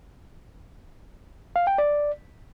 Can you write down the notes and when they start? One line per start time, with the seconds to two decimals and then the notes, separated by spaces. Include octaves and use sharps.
1.56 F5
1.67 G5
1.78 D5